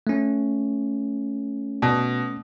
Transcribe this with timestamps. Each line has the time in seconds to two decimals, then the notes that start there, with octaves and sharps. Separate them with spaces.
0.07 A3 C#4
1.82 B2